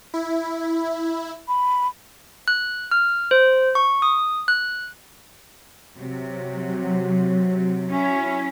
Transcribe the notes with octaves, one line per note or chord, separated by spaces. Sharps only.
E4
B5
F#6
F6
C5
C#6
D#6
F#6
C3 F#3
C#4 E4